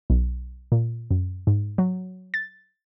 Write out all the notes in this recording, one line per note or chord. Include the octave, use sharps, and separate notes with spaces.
B1
A#2
F#2
G#2
F#3
A6